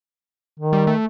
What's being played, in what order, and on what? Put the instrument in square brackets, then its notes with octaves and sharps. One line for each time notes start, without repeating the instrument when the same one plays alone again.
[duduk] D#3
[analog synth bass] G3
A3